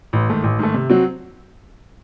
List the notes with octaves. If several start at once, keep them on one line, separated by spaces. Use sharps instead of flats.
A1
G#2 D#3 A3
A1
G#2 D#3 A3
C3
F#3 C4 F#4